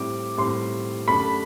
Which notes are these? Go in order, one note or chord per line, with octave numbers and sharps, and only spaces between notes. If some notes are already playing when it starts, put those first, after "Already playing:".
Already playing: A2 G3 C4 D6
A2 G3 C4 C6
F#2 D3 A3 D4 G4 B5